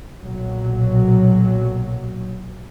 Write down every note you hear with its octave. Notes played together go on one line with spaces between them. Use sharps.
B1 A#2 F#3